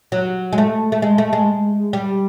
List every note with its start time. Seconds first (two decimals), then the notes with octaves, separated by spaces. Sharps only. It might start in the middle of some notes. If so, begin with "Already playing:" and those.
0.12 F#3
0.53 G#3
0.58 A3
0.92 A3
1.02 G#3
1.18 A3
1.33 G#3
1.93 G3